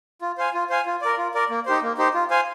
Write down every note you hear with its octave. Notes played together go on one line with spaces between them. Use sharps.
F4
C5 F5 G#5
F4
C5 F5 G#5
F4
A#4 D5
F4
A#4 D5
A#3
D#4 G4 C5
A#3
D#4 G4 C5
F4
C5 F5 G#5